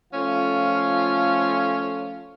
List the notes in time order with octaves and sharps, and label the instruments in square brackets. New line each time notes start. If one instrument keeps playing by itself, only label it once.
[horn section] F3 A3 C#4 F4 A4 F5